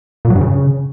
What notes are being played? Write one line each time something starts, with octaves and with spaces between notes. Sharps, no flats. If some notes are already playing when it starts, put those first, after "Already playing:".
A#2
F#3
G2
C#3